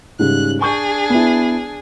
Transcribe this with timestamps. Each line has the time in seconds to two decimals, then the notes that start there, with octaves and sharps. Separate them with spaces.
0.19 G#2 C#3 G3 F#6
0.61 D4 G#4 G#5 C#6 G6
1.10 B3 E4